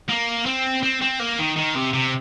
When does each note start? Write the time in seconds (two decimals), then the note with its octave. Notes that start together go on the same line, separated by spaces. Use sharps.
0.09 A#3
0.46 C4
0.83 C4
1.02 C4
1.20 A#3
1.39 D#3
1.56 D#3
1.75 C3
1.93 C3